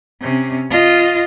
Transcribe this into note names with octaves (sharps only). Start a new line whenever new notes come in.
C3 C#4
F4 D#5